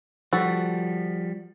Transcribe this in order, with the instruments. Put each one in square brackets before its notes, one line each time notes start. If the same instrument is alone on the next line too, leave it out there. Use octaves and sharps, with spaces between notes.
[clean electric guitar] F3 G3 [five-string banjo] F#4 A4